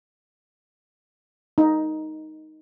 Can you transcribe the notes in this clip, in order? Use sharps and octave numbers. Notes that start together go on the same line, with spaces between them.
D#4